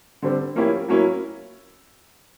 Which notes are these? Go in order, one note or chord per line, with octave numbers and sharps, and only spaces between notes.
D3 G3 C4
F3 A#3 C#4 E4 G4
F#3 A#3 C#4 E4